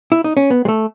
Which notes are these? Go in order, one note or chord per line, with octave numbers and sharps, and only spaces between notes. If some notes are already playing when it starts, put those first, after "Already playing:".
E4
D#4
C#4
B3
G#3
A3